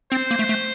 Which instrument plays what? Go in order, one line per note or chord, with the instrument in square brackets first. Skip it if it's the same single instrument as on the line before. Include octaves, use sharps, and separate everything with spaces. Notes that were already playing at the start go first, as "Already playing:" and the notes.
[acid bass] C4 [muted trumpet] C5
[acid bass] A#3
A3
A3